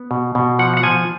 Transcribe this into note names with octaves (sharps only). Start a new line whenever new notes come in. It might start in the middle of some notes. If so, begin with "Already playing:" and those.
Already playing: B3
B2
B2
F3 F#5
F#5
F3 G#5